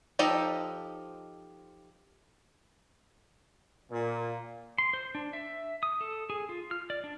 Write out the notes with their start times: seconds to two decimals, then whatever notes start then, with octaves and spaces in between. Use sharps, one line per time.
0.19 F3 D#4 G4 A4 D#5
3.91 A#2
4.78 C6
4.93 C5
5.15 D4
5.33 E5
5.83 D#6
6.01 A4
6.30 G#4
6.49 F4
6.71 F6
6.90 D5
7.04 D4